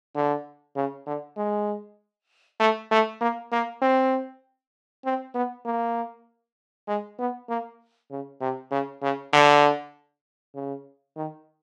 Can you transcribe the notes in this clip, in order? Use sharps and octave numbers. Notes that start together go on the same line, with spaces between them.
D3
C#3
D3
G#3
A3
A3
A#3
A#3
C4
C4
B3
A#3
G#3
B3
A#3
C#3
C3
C#3
C#3
D3
C#3
D#3